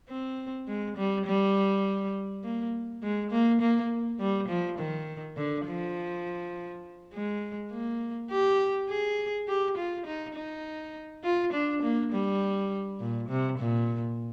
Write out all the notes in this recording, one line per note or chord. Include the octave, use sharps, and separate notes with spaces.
C4
G#3
G3
G3
A#3
G#3
A#3
A#3
G3
F3
D#3
D3
F3
G#3
A#3
G4
G#4
G4
F4
D#4
D#4
F4
D4
A#3
G3
A#2
C3
A#2